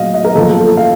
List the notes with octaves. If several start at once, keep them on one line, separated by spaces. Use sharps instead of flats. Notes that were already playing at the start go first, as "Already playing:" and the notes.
Already playing: A#2 F#3 A3 D#5 F5
D#5
A#4
F#2 F3 A#3 A4
A4
F5